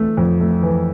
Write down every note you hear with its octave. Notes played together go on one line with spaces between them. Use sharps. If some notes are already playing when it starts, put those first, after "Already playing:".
Already playing: E3 A3
F2
A3
E3